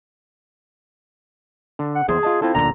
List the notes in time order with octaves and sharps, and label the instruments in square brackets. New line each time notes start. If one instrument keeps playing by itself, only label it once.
[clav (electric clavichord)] D3
[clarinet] F#5
[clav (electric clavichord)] E2 C5 [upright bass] C4 [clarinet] G#4
[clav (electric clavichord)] F4 D#5 A5
[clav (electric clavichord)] C4 F4 A4 [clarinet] E4
[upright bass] D1 C#4 [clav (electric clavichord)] A#2 D3 [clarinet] A#5